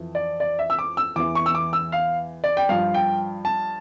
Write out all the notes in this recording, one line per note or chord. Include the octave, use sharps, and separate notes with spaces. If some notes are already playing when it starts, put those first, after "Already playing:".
Already playing: F2 E3
D5
D5
E5
E6
D6
E6
E2 E3 D6
C#6
E6
D6
E6
F5
D5
G5
G2 F3 F5
G5
A5